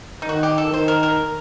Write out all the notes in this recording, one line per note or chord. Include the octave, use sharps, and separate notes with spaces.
D#4
D#3 F#4
G4
A4
D#3 C5
A#4
A#4